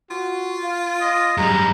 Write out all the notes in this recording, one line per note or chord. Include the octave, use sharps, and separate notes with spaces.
F4 F#4
F5
D#5
F#2 G3 G#3 A#5